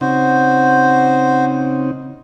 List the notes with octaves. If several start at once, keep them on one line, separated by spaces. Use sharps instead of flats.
C#3 C4 D#4 F#4 C5